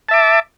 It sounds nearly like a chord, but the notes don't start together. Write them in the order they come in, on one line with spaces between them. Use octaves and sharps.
A5 E5 D6